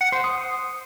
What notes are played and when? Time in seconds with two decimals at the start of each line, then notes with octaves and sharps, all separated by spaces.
0.01 F#5
0.12 C5
0.24 D#6